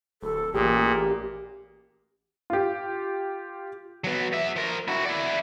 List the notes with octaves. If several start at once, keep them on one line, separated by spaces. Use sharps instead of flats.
D1 A4
A1 A#2 G4 G#4
F4 G4
F#3 B3
B3 E5
F3 A#4
E4 F#4
E4 D5